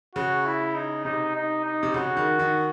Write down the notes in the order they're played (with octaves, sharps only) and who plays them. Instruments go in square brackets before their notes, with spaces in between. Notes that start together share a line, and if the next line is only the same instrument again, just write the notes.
[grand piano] C#3 [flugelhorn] F#4
[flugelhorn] E4
D#4
[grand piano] C3 [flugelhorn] D#4
[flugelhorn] D#4
D#4
[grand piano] C3
[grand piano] C#3 [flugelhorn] F#4
[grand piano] D#3
D#3